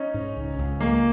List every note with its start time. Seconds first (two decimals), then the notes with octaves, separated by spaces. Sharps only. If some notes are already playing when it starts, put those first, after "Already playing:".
Already playing: C#4 D#4
0.14 G#2
0.37 C#2
0.59 C#2
0.80 G#3 A#3